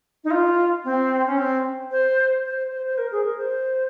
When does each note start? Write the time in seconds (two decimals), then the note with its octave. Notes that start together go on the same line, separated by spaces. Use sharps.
0.24 D#4
0.31 F4
0.85 C4
1.26 C#4
1.38 C4
1.91 C5
2.45 C5
2.72 C5
2.86 C5
2.98 A#4
3.12 G#4
3.25 A#4
3.38 C5